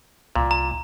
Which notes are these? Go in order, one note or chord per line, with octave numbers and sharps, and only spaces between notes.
C2 A#2
A#5